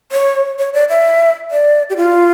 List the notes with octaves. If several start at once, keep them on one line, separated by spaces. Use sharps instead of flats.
C#5
C#5
D5
E5
D5
G4
F4